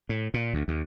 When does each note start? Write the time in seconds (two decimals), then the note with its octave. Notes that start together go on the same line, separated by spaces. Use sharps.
0.09 A2
0.34 A#2
0.54 D2
0.68 D#2